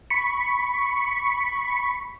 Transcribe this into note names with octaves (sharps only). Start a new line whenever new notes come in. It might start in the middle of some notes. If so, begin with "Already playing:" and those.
B5 C#6